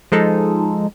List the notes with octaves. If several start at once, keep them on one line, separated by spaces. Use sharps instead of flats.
F3 G#3 D#4 A4